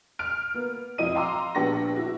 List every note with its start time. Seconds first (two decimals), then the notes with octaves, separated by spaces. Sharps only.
0.19 F6 D7
0.54 A#3 B3
0.98 F2 E4 D#5 D#7
1.15 F5 G5 A#5 C6 D6 E6
1.55 A#1 B3 D4 G4 C#6 A#6
1.96 E4 F#4